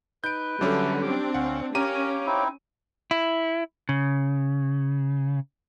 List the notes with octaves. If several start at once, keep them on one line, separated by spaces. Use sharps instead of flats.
D#4 B4 G6 D7
D3 F#3 G3 C#4 A4 E5 D6
C4 D4 G4 D6
D2 C#4 F5 F#5
C#4 G4 A#4 C#5 F5 A#5 D6 D#7
C4 D#4 E4
E4
C#3